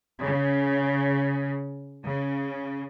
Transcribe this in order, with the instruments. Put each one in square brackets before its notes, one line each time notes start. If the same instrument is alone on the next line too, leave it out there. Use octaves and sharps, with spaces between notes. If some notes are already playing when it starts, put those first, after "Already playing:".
[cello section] C#3
C#3